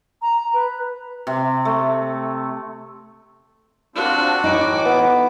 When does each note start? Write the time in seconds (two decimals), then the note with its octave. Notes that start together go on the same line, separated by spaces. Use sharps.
0.22 A#5
0.54 B4
1.27 C3
1.65 A3
3.95 C4 D4 F4 F#4
4.44 A2 E3 D#4 D6
4.86 B3